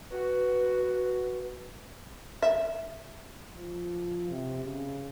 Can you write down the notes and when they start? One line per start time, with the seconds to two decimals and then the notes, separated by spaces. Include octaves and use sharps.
0.11 F#4 B4
2.42 E5
3.53 F3
4.30 C3
4.64 C#3